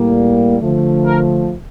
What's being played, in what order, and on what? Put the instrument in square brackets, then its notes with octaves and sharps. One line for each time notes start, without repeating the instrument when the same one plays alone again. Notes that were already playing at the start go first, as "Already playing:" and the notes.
Already playing: [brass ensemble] A2 G3 A#3
D3 F3 A3
A#4